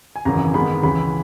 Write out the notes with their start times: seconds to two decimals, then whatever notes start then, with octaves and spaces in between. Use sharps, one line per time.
0.16 G#5
0.25 G#1 F#2 C#3 E3 A#5
0.54 G#1 G#2 D#3 G#3 B3 B5
0.83 C#2 C#3 E3 B5